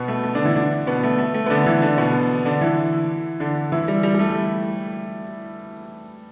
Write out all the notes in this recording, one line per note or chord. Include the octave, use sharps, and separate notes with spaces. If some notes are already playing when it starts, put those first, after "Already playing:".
Already playing: B2 B3
A3
A3
D3 D4
E3 E4
D3 D4
B2 B3
A3
A3
A3
B3
D3 D4
E3 E4
D3 D4
B2 B3
D3 D4
D4
E3 E4
D3 D4
E3 E4
G3
G3
G3
A3